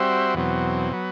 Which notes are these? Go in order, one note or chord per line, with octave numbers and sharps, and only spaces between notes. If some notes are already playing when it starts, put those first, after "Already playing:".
Already playing: G3 C4 F#4 C5 E5
E2 B2 F#3 C4
F#3 B3